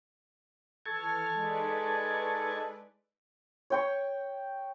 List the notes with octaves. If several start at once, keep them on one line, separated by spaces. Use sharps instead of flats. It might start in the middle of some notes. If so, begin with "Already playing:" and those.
E3 A4 A5 C#6 F6 G#6
G#3 D#4 B4 D5
C#5 G5 C#6